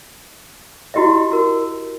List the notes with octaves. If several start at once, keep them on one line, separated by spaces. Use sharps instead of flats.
E4 F#4 G4 D#5 E5
F#4 A#4